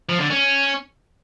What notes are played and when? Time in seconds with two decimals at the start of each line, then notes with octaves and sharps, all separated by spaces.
0.09 F3
0.20 D3
0.30 C#4